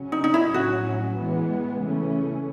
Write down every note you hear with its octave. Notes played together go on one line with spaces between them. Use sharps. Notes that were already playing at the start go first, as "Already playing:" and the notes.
Already playing: C#3 F#3 C#4
D#4
D#4
E4
A2 F#3 C#4 F#4
E3 G#3 B3
C#3 E3 A3 C#4